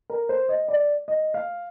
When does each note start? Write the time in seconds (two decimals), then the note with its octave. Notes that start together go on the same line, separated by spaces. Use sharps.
0.10 A#4
0.29 C5
0.49 D#5
0.68 D5
1.08 D#5
1.34 F5